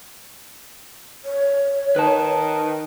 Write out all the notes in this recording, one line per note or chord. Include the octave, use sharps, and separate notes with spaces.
C#5
D#3 B4 A5